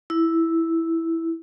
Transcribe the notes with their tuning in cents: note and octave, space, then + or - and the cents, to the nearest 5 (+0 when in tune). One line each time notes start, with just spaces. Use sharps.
E4 +0